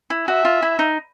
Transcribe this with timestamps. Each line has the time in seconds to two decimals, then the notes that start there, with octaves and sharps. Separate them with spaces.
0.10 E4
0.28 F#4 E5
0.45 F4
0.62 E4
0.79 D#4